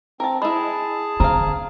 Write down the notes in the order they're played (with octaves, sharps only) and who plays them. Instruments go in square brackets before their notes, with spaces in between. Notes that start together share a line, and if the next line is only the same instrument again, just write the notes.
[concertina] C4 [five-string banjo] A#4 A5
[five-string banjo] G#3 E4 [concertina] G#4 A5 [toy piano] B5
[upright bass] D3 [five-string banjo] C4 F5 [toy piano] A#5